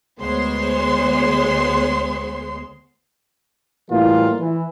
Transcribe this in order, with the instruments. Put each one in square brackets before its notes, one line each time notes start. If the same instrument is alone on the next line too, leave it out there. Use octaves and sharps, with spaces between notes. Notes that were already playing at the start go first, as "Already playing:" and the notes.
[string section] D2 G#3 B3 C5 C#5 C6
[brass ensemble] A2 E3 G3 A#3 F4
E3